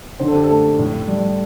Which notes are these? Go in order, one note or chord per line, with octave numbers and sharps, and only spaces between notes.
D3 C5
A4
G4
A4
A3
A2
G3